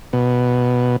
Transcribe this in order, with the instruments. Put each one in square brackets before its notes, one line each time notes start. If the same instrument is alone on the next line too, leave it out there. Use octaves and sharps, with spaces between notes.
[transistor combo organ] B2